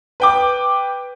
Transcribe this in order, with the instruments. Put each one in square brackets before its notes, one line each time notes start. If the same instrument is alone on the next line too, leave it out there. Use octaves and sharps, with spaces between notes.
[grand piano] B4 G5 D6